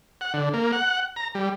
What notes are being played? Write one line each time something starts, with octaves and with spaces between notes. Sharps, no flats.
F#5
D3
A#3
F#5
A#5
G3